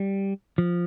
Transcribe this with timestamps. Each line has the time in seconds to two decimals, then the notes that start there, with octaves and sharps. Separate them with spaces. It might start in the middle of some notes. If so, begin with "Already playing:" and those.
Already playing: G3
0.58 F3